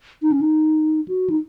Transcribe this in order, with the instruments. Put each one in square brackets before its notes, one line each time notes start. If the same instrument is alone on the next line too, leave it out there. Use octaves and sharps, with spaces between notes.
[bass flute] D#4
C#4
D#4
F#4
D#4